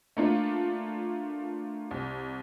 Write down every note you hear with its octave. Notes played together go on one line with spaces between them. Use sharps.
A3 A#3 D4 F4
C2